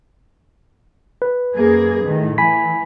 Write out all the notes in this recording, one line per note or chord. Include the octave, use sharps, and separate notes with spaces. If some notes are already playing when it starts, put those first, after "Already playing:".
B4
F#2 A#3 G#4
A2 D#3
E3 G#5 B5 B6